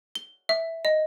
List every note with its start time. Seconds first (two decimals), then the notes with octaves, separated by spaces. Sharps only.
0.15 G7
0.49 E5
0.85 D#5